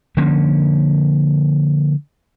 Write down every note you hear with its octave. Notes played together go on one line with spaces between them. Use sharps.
D3 F3 A#3 C#4